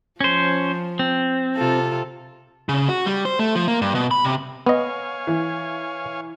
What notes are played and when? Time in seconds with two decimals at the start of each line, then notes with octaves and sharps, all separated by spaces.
0.21 F3 C#4 C5
0.99 C4
1.56 C3 F4 A4
2.69 C#3
2.89 F#4
3.06 G3
3.25 C5
3.39 A3
3.55 F3
3.68 A#3
3.81 G2
3.95 B2
4.11 B5
4.24 C3
4.66 B3 C#5 D#5 F5 G#5
5.27 E3